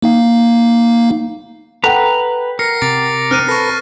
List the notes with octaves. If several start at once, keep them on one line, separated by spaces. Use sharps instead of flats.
A#3 D#4 F5
A4 B4 F#5 G5 A#5
A#4 A#6 C7 C#7
C3 A#5 D6 A6 C7
C4 F6 F#6 D#7
A4 B4 C#6 A#6